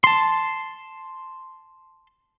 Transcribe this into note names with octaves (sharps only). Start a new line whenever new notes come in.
A5 C6